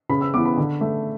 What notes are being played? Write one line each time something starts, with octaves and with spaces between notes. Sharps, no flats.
C#3 B5
E6
E3 B3 D6
B5
D3
A3